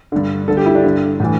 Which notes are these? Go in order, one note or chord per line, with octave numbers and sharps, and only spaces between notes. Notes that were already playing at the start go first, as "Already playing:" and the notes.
G2 D3
G2 D3 A4
G4
E4
D4
G2 D3
A2 E3